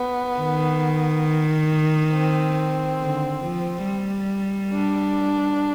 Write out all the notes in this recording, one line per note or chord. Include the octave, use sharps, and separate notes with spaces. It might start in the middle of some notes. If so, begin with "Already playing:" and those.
Already playing: B3
D#3
C4
D3
F3
G3
D4